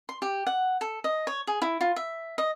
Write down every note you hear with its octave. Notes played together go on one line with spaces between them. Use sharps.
C6
G4
F#5
A4
D#5
C#5
G#4
E4
F4
E5
D#5